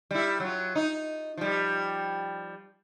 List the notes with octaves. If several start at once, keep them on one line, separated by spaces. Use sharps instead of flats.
G3 E4
F#3 F4
D#4
F3 G3